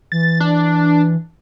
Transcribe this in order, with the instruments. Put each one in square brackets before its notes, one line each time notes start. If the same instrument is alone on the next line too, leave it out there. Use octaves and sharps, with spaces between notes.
[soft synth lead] E3 [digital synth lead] A6
[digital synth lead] D4